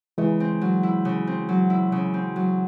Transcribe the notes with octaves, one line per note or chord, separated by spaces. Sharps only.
C#3 E3 G#3
C4
F#3
E4
C#3
C4
F#3
E4
C#3
C4
F#3